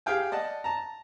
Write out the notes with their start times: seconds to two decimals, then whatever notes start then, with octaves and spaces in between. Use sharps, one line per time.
0.06 G4 G#4 F5 G5 G#5
0.32 D5 D#5 F#5 A5
0.64 A5 A#5